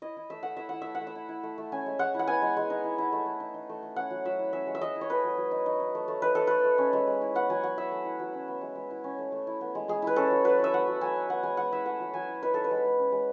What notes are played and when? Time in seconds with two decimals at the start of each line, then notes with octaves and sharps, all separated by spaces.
0.02 E4 D#5
0.17 E4
0.30 A3 E5
0.43 A3 F#5
0.57 E4 E5
0.69 E4 F#5
0.82 E5
0.87 A3
0.95 F#5
1.01 A3
1.07 E5
1.15 E4
1.29 E4
1.43 A3
1.58 A3
1.72 C#4 G#5
1.86 G#3
1.99 G#3 F#5
2.14 E4 F#5
2.28 B3 G#5
2.42 G#3
2.57 G#3
2.70 D#4
2.84 E4
2.98 E4
3.12 A3
3.26 A3
3.40 D#4
3.54 D#4
3.69 A3
3.83 A3
3.96 C#4 F#5
4.10 F#3
4.25 F#3 E5
4.39 E4
4.53 C#4 E5
4.67 G#3
4.75 E5
4.81 G#3 D#5
4.96 E4
5.01 C#5
5.10 A3 B4
5.24 F#3
5.37 F#3
5.51 D#4
5.66 D#4
5.80 D#4
5.95 A3
6.08 A3
6.22 D#4 B4
6.35 D#4 A4
6.47 A3 B4
6.64 A3
6.78 C#4
6.93 G#3
7.07 G#3
7.22 E4
7.35 B3 F#5
7.50 F#3 G#5
7.63 F#3 F#5
7.77 E4 E5
7.92 A3
8.05 E4
8.19 F#3
8.34 C#4
8.48 B3
8.61 G#3
8.75 G#3
8.91 E4
9.04 C#4
9.18 A3
9.32 A3
9.47 E4
9.61 B3
9.75 G#3
9.88 G#3 G#4
10.02 E4 B4
10.16 C#4 A4
10.30 F#3
10.44 F#3 B4
10.59 E4 E5
10.74 A3 F#5
10.88 F#3
11.01 F#3 G#5
11.16 D#4
11.29 B3 F#5
11.43 G#3 G#5
11.57 G#3 F#5
11.71 E4 E5
11.85 A3 F#5
12.00 F#3
12.14 F#3 G#5
12.28 E4
12.43 D#4 B4
12.54 D#4 A4
12.64 B4
12.71 G#3
12.85 G#3
12.99 C#4
13.12 G#3